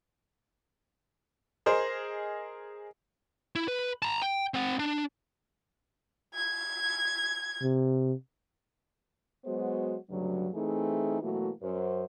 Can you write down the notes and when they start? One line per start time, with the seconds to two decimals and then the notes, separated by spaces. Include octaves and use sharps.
1.66 G#4 A#4 C5 D#5
3.55 E4
3.68 B4
4.02 A5 A#5
4.22 G5
4.54 C4 F#5
4.79 D4
6.34 G#6
7.62 C3
9.45 F#3 G#3 B3 F#4 C5
10.09 D2 G2 C#3 F#3
10.54 E3 A3 C4 D#4 G#4
11.21 B2 E3 F#3 A3 A#3 F#4
11.62 F#2 F#3 C5